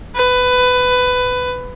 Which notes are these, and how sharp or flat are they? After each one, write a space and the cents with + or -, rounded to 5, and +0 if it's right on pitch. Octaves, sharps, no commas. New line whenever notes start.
B4 +15